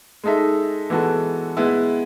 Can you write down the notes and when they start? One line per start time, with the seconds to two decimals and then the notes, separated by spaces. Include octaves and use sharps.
0.24 G#3 D#4 A4 E5
0.90 E3 G#3 B3 F#4 A4
1.57 G#3 B3 E4